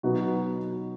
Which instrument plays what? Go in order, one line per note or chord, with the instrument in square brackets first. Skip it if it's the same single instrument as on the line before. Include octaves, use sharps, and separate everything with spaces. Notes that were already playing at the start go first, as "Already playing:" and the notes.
[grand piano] B2 F#3 B3 D#4 F#4